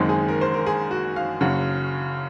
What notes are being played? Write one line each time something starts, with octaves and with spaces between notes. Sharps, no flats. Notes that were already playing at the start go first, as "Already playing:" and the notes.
Already playing: F#1 F#2 D#3 G#3 C4
G#4
A#4
C5
A#4
G#4
F#4
F5
F#1 F#2 C#3 F#3 F#5